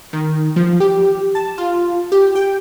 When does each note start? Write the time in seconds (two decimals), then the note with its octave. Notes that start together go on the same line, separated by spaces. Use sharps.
0.13 D#3
0.56 F3
0.80 G4
1.35 A5
1.58 F4
2.12 G4
2.35 G5